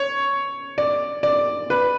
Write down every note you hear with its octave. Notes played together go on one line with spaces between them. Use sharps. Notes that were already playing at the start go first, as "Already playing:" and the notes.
Already playing: C#5
D5
D5
B4